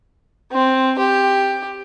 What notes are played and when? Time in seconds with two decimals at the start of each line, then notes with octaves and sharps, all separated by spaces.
0.52 C4
0.99 G4